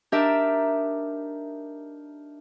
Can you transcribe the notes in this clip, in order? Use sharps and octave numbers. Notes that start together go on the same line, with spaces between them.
D4 D#4 G4 A#4 D5 E5